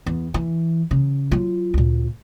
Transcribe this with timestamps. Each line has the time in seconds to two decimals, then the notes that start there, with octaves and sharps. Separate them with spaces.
0.06 E2
0.34 E3
0.91 C#3
1.31 F#3 F4
1.74 D2 A#2